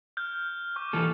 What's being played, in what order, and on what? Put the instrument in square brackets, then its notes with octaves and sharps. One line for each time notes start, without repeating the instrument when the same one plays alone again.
[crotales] F6 G6
C#6 D6 F6
[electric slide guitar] E3 A#3 A4